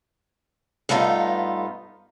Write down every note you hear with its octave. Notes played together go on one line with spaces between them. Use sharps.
G2 A3 B3 D#4 F4